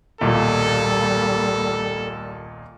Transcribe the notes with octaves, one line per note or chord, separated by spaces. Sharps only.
D#1 B1 A#2 G3 A#3 A4